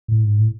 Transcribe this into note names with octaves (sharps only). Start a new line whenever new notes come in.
A2
G#2
A2